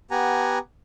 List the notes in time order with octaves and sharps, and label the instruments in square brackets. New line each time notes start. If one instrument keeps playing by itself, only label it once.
[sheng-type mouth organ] B3 G4 F#5 G#5 A#5